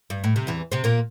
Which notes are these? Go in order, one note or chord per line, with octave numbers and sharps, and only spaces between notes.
G2
A2
C3
E2 E3
C3 C4
A#2 A#3